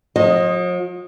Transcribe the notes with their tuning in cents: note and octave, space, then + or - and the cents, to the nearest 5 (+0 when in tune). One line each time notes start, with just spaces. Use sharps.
F3 +45 D#5 +0